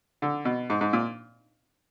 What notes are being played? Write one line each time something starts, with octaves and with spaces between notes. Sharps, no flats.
D3
B2
G#2
G#2
A#2